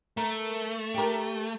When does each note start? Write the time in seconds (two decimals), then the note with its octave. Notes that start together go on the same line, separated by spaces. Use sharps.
0.17 A3 A#4
0.94 G4 A#4